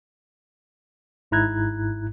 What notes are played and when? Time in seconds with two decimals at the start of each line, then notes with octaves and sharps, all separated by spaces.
1.31 G#1 G#2 E4 A#5 F#6 G#6